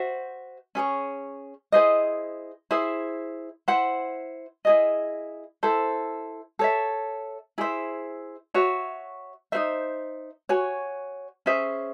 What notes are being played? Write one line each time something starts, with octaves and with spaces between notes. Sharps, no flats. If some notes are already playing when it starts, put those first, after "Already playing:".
Already playing: F#4 C5 E5
C#4 G#4 C#5
E4 G#4 C5 D#5
E4 G#4 C5 E5
E4 C5 F#5
E4 G#4 D#5
E4 A4 C5
A4 C#5 E5
E4 G#4 C5 E5
F#4 C#5 E5
D#4 F#4 C5 E5
F#4 C#5 G#5
C#4 G#4 C5 E5